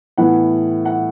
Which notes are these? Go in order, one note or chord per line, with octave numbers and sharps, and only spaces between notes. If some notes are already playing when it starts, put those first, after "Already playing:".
A2 E3 B3 F#5
F#5